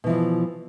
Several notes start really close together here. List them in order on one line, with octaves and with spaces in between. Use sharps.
B2 E3 F3